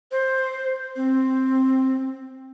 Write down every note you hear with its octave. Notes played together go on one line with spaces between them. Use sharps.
C5
C4